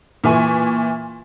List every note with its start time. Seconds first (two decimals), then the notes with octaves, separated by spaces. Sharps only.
0.24 A#2 E3 G#5 C#6